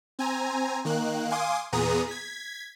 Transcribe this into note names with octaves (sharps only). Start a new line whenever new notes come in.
C4 G#5 A#5
D#3 A#3 F#6
F5 G#5 C6 D6 D#6
E2 A#2 B3 G#4 A#5 D#6
G#6 B6